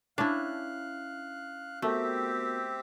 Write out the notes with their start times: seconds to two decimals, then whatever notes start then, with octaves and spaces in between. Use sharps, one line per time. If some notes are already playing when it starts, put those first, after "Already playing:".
0.18 C#4 D4 E4 F5 F#6
1.82 A3 B3 C4 F#4 G4 A#4 E5